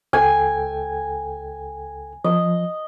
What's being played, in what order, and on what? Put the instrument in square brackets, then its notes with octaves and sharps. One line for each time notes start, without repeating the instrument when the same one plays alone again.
[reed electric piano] C#2 A4 G5 [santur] G#5
[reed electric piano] F3 [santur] D#5